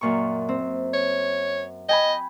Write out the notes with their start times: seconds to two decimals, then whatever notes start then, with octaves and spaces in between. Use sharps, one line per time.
0.01 F#2 A#2 C#6
0.49 C4
0.94 C#5
1.89 D#5 G5 G#5 B5